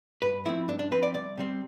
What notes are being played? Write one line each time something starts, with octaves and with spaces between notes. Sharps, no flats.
G2 B4
F3 A3 C4 E4
G2 D4
D4
F3 C4 B4
D5
C2 D5
C3 G3 C4